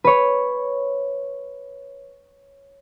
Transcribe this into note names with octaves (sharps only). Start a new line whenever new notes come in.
B4 C#5